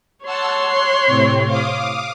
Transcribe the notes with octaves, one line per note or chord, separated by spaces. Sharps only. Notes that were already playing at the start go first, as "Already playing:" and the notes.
C#5 F#5 A5 C6 E6
F#6
A2 C3 C4
F5 D6 D#6